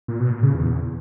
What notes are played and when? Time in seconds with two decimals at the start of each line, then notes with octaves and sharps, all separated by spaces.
0.08 A#2
0.20 B2
0.31 A#2
0.43 C#3
0.54 E2